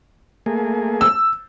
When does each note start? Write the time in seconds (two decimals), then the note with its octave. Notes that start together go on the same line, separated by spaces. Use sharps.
0.46 A3 A#3 G#4
1.01 E6